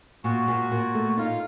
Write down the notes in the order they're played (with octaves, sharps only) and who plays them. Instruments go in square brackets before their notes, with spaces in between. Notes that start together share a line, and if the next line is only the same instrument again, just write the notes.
[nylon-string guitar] A#2 [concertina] F#4
[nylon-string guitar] A#2
A#2
A3
[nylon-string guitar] D#4 [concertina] F4